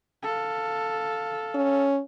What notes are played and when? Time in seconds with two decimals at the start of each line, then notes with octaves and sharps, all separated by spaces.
0.23 A4 F5
1.55 C#4